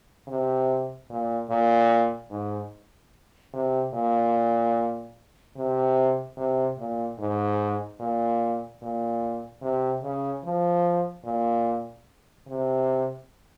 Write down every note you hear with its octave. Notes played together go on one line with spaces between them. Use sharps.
C3
A#2
A#2
G#2
C3
A#2
C3
C3
A#2
G#2
A#2
A#2
C3
C#3
F3
A#2
C3